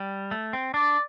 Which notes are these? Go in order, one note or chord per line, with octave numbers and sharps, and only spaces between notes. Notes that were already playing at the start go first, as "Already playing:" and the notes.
Already playing: G3
A3
C4
D4 D5